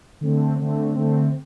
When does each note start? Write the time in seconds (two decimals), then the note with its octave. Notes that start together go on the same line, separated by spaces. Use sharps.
0.21 D3 A3 C4
0.58 D3 A3 C4
0.95 D3 A3 C4